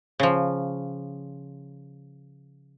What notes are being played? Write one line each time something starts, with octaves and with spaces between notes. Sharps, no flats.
C#3 F3